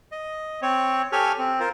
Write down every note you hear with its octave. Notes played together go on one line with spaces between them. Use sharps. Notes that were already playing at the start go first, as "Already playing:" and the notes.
D#5
C4 C#5
G4 A4 C#5 G#5 F6
C4
F4 A#4 C5